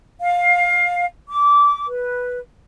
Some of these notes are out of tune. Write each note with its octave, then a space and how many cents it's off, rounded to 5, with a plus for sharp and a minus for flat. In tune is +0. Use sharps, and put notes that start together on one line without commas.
F5 +20
D6 -20
B4 -5